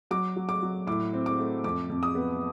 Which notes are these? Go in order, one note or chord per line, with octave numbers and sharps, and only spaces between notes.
F#3 D6
F#3
D6
F#3
A2 D6
C4
D6
A3
F2 D6
F2
D#6
B3